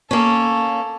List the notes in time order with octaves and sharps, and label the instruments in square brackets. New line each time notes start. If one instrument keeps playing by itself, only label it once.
[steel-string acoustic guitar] A#3 C#4 [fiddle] A4